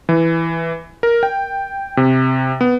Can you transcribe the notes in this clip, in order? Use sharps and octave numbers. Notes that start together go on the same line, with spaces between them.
E3
A#4
G5
C3
B3